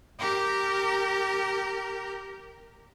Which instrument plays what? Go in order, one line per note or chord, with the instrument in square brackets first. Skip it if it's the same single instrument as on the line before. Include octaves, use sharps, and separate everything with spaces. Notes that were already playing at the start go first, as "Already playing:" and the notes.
[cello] G4 A#4